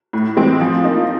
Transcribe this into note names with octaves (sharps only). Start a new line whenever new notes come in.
A2
E3 G#3 C4
F3
A#3 D#4